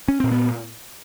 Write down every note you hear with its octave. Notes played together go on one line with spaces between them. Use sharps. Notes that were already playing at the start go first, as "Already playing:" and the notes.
C#4
A#2 C4
B3